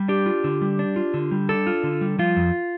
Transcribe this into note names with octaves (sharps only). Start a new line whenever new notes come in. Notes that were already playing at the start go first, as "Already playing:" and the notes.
Already playing: G3
D4 G4
F4
D3
G3
D4
F4
D3
G3
D4 A4
F4
D3
G3
F3 F4
F2